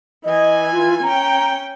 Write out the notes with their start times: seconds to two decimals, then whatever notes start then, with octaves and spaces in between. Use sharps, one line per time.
0.25 E3 D#5 G#5
0.73 F4
1.03 C#4 G5 A#5